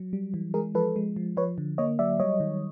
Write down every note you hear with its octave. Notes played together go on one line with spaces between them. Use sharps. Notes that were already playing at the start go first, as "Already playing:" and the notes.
Already playing: F#3
G3
E3
G#3 G#4 A#4
F3 A4 B4
G#3
F3
F3 B4 C#5
D3
A#3 C#5 D#5
F#3 D5 E5
G3 C#5 D#5
D#3